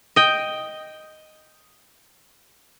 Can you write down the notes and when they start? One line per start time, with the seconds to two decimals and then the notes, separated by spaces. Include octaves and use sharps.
0.16 D#5 G5